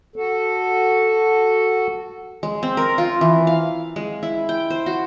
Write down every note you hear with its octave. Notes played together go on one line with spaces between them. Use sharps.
F#4 A4
G#3
C4
A#4
F4
E3
F5
G#3
E4
G5
C5
F#4